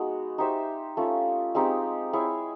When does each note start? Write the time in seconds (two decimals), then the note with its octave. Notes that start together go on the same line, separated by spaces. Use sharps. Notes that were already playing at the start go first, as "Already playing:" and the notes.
Already playing: G#3 B3 D#4 F#4
0.38 D#4 G4 C5 E5
0.97 A3 C#4 F4
1.55 G#3 C4 D#4 G4
2.13 E4 G#4 C#5